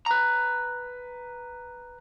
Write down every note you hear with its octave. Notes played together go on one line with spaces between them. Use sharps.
B4 A#5